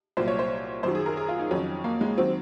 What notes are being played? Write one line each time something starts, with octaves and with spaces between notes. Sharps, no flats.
C2 A#2 F#3 C5
C#5
C5
F#2 D#3 F#3 C5
G#4
A#4
G#4
F4
D#4
F2 D#3 F#3 C#4
A#3
G#3
D#3 F#3 C4